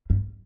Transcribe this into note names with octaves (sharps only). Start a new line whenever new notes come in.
G2